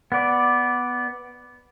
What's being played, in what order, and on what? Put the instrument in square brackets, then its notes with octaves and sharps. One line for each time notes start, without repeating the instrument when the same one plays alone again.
[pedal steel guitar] B3 D5